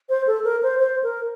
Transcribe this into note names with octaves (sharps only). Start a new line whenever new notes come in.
C5
A4
A#4
C5
C5
A#4